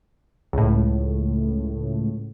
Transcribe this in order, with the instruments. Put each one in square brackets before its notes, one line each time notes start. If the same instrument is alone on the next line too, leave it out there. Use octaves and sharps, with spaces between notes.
[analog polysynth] C#2 A2